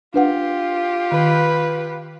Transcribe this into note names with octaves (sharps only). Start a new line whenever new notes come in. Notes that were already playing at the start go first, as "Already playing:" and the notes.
D4 F4 G4 B4 F#5
D#3 B4